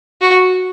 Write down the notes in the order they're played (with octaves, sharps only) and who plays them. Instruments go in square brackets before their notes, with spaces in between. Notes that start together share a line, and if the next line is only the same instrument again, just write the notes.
[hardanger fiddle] F#4